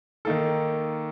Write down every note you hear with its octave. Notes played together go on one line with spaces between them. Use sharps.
D#3 A#3 D#4 A4